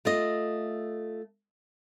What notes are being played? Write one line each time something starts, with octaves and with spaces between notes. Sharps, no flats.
A3 F4 D#5